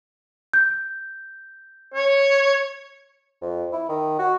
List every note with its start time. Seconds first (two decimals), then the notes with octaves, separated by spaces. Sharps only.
0.53 G6
1.94 C#5
3.41 F2
3.72 E4
3.89 D#3
4.19 F#4